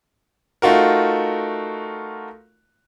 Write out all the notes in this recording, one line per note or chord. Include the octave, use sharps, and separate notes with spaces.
A3 D#4 F4 F#4 A#4